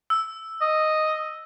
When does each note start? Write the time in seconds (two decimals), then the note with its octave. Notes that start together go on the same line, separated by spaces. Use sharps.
0.10 E6
0.61 D#5